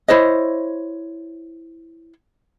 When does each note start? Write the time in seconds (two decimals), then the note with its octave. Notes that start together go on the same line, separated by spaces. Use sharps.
0.08 E4 C5 C#5 D#5